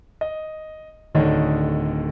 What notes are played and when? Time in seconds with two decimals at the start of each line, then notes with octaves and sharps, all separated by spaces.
0.21 D#5
1.15 D1 D3 D#3 D4 C#5 D#5